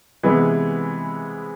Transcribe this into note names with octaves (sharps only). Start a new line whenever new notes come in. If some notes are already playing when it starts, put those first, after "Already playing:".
C3 E3 G#3 B3 E4